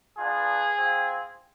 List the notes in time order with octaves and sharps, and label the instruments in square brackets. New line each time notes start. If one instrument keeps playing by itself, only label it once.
[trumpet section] B3 D4 F4 G#4
C4 F4